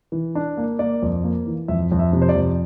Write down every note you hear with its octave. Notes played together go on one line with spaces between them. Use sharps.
E3
D4
A#3
A#3 D5
F2
A#3
E3
F2 E5
F2
E5
C3
C5
D5
F2